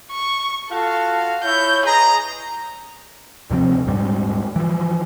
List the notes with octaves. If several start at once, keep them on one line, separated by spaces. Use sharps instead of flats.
C#6
F4 F#4 A4 F5
E4 C#5 G6
G#4 B4 D#5 A#5
D#2 C3 F3 C4
D#1 G#2 G3
E3 F3